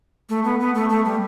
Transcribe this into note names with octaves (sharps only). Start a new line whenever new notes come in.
A3
B3
B3
A3
A3
G3